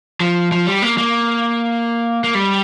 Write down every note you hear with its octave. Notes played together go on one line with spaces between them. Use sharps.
F3
F3
G3
A#3
A#3
A#3
G3